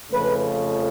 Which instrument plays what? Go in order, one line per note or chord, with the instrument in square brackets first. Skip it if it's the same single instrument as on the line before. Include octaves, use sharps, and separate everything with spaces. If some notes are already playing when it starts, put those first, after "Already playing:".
[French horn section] F2 C#3 F3 A3 B4